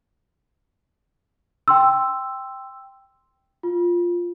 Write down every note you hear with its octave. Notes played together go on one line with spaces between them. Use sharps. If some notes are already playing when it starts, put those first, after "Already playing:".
G5 C6 E6
F4